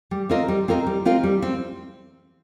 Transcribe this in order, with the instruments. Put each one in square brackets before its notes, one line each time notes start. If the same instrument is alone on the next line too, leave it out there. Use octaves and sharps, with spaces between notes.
[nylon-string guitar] G3
C4 F4 A#4 D#5
G3
C4 F4 A#4 D#5
G3
C4 F4 A#4 D#5
G3
C4